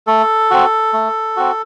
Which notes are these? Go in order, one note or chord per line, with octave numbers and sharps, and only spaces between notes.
A3 A4
C4 F#4
A3
C4 F#4